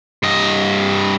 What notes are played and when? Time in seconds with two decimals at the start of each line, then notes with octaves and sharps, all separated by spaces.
0.23 G2 D#5